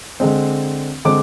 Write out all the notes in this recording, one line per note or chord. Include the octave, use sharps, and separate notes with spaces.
D3 G#3 C4
D3 G#3 C4 D6